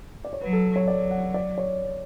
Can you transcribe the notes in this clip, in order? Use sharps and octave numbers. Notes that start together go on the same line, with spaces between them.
D5
C#5
F#3 B4
A4
C#5
F#3 D5
F#5
D5
C#5